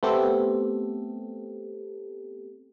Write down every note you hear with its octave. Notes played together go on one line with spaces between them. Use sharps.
A3 B3 C4 G4 A4